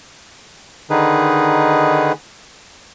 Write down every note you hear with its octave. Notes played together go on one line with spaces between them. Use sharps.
D3 D#3 D#4 G#4 B4